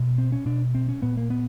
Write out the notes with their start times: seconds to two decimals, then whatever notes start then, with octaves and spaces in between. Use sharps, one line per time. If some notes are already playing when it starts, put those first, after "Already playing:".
Already playing: B2
0.18 C4
0.32 C#4
0.46 B2 D4
0.75 C4
0.89 C#4
1.02 A#2 B3
1.17 A#3
1.30 B3